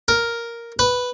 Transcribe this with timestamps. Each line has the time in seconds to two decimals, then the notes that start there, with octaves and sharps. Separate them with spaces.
0.08 A#4
0.79 B4